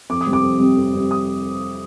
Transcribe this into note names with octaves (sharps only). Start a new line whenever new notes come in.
F2 D6
D#6
C3 G3 C4
D6
F2
C3 G3 C4
F2
C3 G3 C4
D#6